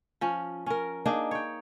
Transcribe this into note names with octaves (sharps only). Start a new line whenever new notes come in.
F3 C#4
C#4 A#4
A#3 D4 D#4 G#4
C#5 G5